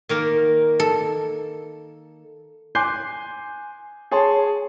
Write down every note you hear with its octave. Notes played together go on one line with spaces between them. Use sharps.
D#3 A#3 A#4
A4
G#5 C6 D6 F#6 G6 C7
G#4 C#5 A5 C6